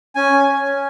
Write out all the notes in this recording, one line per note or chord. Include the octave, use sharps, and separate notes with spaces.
C#4 G#5
C#4